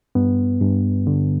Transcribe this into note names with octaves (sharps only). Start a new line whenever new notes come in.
G2 B3
G2
D3